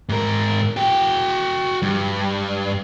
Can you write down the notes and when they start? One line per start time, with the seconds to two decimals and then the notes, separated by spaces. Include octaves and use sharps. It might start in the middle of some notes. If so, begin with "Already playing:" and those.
0.09 G#2 A#4
0.77 F#4 G5
1.82 G2